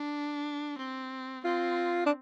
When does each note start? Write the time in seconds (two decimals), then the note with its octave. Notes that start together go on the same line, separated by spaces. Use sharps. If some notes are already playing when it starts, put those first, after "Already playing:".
Already playing: D4
0.78 C4
1.44 C4 F4
2.06 D4